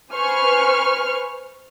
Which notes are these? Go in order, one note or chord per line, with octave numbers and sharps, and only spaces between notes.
B4 C5 G#5 C#6 F6